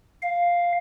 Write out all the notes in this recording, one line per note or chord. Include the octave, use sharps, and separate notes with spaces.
F5